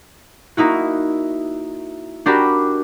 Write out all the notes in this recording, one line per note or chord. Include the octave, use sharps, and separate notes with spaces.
A#3 D#4 E4 F#4
D4 F#4 G4 A#4 B5